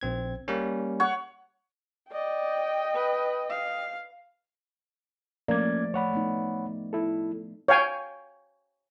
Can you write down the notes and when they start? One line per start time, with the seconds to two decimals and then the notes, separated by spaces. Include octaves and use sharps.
0.01 A#1 C4 G#6
0.48 G3 A#3 C#4
1.00 C#5 F#5
2.12 D5 D#5 G5
2.94 B4
3.50 F5
5.48 F3 A3 A#3 C#4 D5 G#6
5.94 A3 C#5 F#5 B5
6.13 A3 B3 D#4
6.93 E4 A4
7.68 C#5 F5 G5 G#5